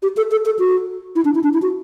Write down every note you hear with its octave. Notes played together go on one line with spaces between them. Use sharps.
G4
A4
A4
A4
F#4
E4
D4
E4
D4
E4
F#4